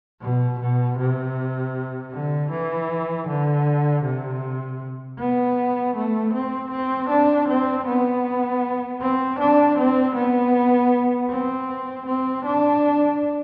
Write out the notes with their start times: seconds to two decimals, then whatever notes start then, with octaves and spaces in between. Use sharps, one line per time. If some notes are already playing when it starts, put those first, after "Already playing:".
0.21 B2
0.60 B2
0.98 C3
2.12 D3
2.51 E3
3.28 D3
4.04 C3
5.19 B3
5.96 A3
6.33 C4
6.71 C4
7.10 D4
7.49 C4
7.87 B3
9.01 C4
9.40 D4
9.78 C4
10.15 B3
11.30 C4
12.06 C4
12.46 D4